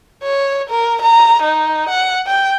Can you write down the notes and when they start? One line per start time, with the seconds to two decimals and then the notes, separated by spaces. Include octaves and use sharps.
0.24 C#5
0.70 A#4
1.02 A#5
1.42 D#4
1.89 F#5
2.27 G5